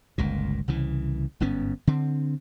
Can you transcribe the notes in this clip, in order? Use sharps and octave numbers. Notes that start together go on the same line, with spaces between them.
G1 C#2 A#2
C2 C#3 E3
G1 G#2 B3 C#4
D3 C4